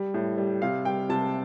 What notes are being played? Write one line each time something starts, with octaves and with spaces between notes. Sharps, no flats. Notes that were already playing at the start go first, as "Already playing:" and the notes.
Already playing: G3
A2
G3
C3 F5
G3 G5
C3 A5